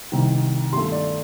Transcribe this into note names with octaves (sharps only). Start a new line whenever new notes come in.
C2 C3 D#3
G2 D#3 A3 C6
D5